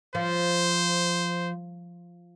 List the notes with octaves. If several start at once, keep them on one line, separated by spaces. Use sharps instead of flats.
F3 C5